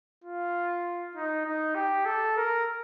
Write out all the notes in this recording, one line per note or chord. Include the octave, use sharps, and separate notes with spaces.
F4
D#4
D#4
G4
A4
A#4